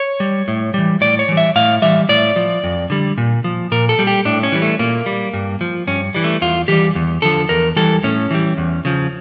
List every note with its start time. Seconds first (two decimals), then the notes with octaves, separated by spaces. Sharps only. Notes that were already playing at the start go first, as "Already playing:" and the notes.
Already playing: C#5
0.20 G3
0.48 A2
0.74 E3 G3
1.01 A2 D5
1.19 C#5
1.29 E3 G3
1.37 E5
1.56 A2 F5
1.82 E3 G3 E5
2.09 A2 D5
2.36 F3
2.64 F2
2.90 D3 G3
3.18 A#2
3.44 F3
3.72 A#2 A#4
3.89 A4
3.99 G3
4.07 G4
4.25 A2 D4
4.43 C#4
4.52 E3 G3
4.62 A3
4.79 A#2 A#3
5.06 G3
5.33 G2
5.61 F3
5.87 G2 C#4
6.15 E3 G3
6.24 A3
6.42 E2 F4
6.68 E3 G3 G4
6.95 E2
7.22 D3 F3 A4
7.49 E2 A#4
7.76 E3 G3 A4
8.03 A2 C#4
8.31 E3 G3
8.58 E2
8.85 C#3 F3